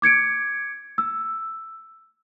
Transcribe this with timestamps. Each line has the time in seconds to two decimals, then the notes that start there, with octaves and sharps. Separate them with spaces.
0.02 D6 G#6 C#7 D7
0.98 E6